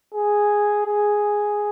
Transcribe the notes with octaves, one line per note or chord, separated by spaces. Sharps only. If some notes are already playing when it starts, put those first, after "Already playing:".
G#4
G#4